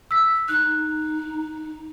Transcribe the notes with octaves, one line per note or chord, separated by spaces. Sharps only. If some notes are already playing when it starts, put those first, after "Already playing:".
E6 B6
D#4 F#6